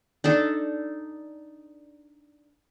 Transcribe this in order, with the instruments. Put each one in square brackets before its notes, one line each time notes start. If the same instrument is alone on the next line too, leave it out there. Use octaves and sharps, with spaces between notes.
[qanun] D4 D#4 A4